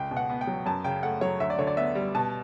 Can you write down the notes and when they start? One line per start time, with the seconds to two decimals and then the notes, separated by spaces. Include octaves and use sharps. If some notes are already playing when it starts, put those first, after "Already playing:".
Already playing: C#2 G5
0.11 B2
0.17 F#5
0.30 B3
0.41 G5
0.47 F#3
0.66 F#2 A5
0.84 C#3 G5
1.03 A3 F#5
1.21 F#3 C#5
1.40 D2 E5
1.50 D5
1.58 D3 C#5
1.67 D5
1.77 B3 E5
1.95 G3
2.15 B2 A5